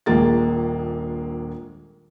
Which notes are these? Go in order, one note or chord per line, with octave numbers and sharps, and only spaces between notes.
D#1 A#1 G#3 A#3 A6